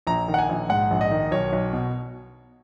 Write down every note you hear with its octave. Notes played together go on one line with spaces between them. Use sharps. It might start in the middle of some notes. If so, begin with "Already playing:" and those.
A#1 A#5
D#3
F#5
G#5
A#1
G#2 F#5
A#1
D#5
D#3
B1 C#5
B1
B2